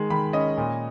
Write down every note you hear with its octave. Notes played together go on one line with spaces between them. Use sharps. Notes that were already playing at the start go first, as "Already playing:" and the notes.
Already playing: D#3 G#3
D#3 B5
C#4 D#5
A#2